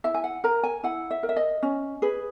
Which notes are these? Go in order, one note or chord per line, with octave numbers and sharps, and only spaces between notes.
E4 E5
G#5
F#5
A#4 A#5
G#5
E4 F#5
E5
A#4
E5
D#5
C#4
G#4 B4